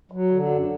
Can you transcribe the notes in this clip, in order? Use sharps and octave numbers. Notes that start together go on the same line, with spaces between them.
F#3
D3
F#2